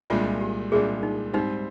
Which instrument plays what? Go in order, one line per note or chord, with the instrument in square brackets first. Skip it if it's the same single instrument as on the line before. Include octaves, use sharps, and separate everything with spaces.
[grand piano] C2 A#2 G#3 D4 [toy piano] F4
[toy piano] G4
[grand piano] C2 A#2 G#3 D4 [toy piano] G#4
[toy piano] D#4
[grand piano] G#2 G3 C4 [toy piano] D#4